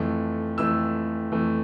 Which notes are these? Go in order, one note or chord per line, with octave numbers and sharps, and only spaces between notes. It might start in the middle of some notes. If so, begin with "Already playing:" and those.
Already playing: F2 E3 A3
F2 E3 A3 E6
F2 E3 A3